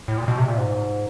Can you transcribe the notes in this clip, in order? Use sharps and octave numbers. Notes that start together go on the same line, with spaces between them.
A2
A#2
B2
C3
A#2
G#2